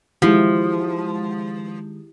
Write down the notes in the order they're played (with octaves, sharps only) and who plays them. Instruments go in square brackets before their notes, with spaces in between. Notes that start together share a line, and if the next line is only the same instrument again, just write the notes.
[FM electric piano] D#3 G#3 [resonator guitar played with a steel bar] F3 [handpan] E4 G4